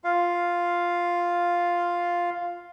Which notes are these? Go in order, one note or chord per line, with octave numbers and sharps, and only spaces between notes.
F4 F5